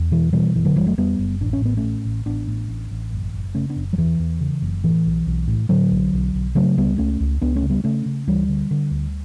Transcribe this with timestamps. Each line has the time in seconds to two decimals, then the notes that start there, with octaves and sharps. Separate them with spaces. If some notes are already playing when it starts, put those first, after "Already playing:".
Already playing: E2
0.11 B2 E3
0.32 B2 E3 G3
0.55 F#1 E3
0.65 D3 F#3
0.76 F#1 E3 G3
0.86 F#3 A3
0.97 E2 G3 B3
1.19 F#1
1.41 A1 D4
1.53 C#4
1.62 A2 B3
1.77 A3 C#4
1.83 A2
2.05 A1
2.26 A1 B3 D4
2.47 A2
2.69 A1
2.91 A1
3.13 F#1
3.34 F#1
3.55 C#3 A3 C#4
3.70 B3 D4
3.76 F#1
3.93 F#3
3.98 E2 E3
4.19 E2
4.40 C#3
4.62 F#1
4.84 A2 E3
5.06 B1
5.27 B1
5.48 A2
5.69 A2 D3 F#3
5.91 B1
6.13 B1
6.34 B1
6.55 C#3 F#3 A3
6.77 C#2 G3 B3
6.98 C#2 A3 C#4
7.20 C#2
7.42 C#2 B3 D4
7.56 A3 C#4
7.62 C#3
7.70 G3 B3
7.84 C#3 A3 C#4
8.06 C#3
8.27 D2 E3 G3
8.49 D3
8.71 D3
8.91 D2